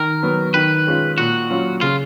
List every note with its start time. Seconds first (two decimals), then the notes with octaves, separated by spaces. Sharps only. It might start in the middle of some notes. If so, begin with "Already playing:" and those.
Already playing: D#3 A#4
0.23 F#3 B3
0.54 D#3 B4
0.87 G#3 C#4 F4
1.18 A#2 F#4
1.50 F#3 C#4 F4
1.81 C#3 F4